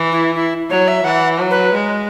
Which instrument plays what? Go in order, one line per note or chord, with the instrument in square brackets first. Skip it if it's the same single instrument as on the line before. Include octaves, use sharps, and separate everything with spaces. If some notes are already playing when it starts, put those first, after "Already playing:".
Already playing: [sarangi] E3
[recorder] E4
E4
[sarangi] F#3 [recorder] C#5
[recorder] E5
[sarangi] E3 [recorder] F#5
[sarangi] F#3
[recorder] B4
[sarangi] G#3